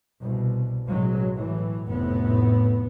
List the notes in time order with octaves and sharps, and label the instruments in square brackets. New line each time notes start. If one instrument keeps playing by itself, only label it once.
[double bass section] C2 B2
A1 B2 F#3 G#3
A2 E3
F1 A2 B3